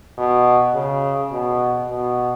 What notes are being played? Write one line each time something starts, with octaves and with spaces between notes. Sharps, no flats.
B2
C#3
B2
B2